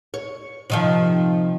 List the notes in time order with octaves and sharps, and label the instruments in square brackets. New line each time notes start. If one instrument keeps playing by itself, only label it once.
[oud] C#5
C3 D#3 F3